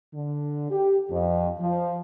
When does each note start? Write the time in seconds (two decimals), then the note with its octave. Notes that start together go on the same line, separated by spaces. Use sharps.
0.14 D3
0.71 G4
1.10 F2
1.60 F3